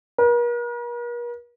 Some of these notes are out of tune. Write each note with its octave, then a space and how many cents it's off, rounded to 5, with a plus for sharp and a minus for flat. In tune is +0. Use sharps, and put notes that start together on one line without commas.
A#4 +45